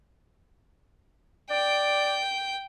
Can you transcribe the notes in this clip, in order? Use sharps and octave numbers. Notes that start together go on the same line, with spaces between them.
D5 G5